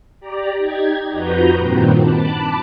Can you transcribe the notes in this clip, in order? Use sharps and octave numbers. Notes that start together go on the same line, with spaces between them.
G4 D5 A#5
D#4 G4 G#6
F2 F3 F#4 B4 A#5 G6
G2 A#2 D#3 C4
A5 B5 D6 F#6